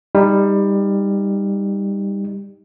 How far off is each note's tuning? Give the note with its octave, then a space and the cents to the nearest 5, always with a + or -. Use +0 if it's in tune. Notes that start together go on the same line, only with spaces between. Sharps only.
G3 +20 D#4 +10